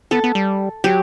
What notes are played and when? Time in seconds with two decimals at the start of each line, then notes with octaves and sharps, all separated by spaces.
0.11 B3 A4
0.24 B3
0.35 G3
0.84 F#3 G4